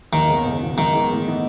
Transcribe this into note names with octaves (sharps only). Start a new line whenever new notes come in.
D#2 D#3
C#3 G#3 B3
F#1
E2 B2
G#2 D#3
E3 G#3 B3
A2
E3 B3 D#4